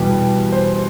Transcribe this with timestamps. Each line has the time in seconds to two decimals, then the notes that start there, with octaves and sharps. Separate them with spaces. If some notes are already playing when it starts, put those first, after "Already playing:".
Already playing: E2 B2 G3 B3 G4
0.52 C5